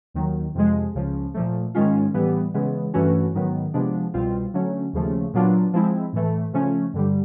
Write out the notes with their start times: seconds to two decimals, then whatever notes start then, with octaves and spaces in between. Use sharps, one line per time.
0.14 D#2 D#3 F#3
0.55 F2 C3 F3 G#3
0.94 C#2 C#3 F3
1.34 A#2 F3 A3
1.74 G#2 D#3 G#3 C#4 F4
2.14 A2 E3 G3 B3
2.54 C#3 E3 G#3 B3
2.94 G2 E3 A3 C#4 F#4
3.34 G#2 D#3 F#3 B3
3.74 C3 F3 G#3 B3 D4
4.14 C2 B2 G3 C4 F4
4.54 D3 F#3 A3 C#4
4.93 D#2 C#3 F3 A3
5.34 A#2 F#3 B3 D4 F4
5.73 F3 G#3 C4 E4
6.13 A2 E3 A3
6.53 C#3 F3 A3 C#4
6.93 G2 D3 G3